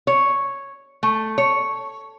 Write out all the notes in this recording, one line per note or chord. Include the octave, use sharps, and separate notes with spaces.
C#5
A3
C#5